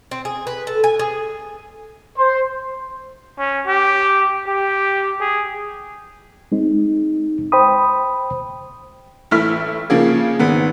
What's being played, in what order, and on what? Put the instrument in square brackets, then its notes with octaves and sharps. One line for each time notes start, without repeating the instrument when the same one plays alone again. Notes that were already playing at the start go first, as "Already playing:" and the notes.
[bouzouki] C4
G#4
B4
A4
G#5
G#4
[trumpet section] C5
[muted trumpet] C#4
G4
G4
G#4
[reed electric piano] G#3 C4 D#4
C5 G5 B5 D#6
[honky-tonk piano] A1 A3 E4 F6 B6
C#3 F3 A#3 G#4
G#1 B3